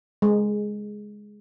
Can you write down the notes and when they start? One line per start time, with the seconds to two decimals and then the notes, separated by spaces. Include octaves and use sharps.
0.22 G#3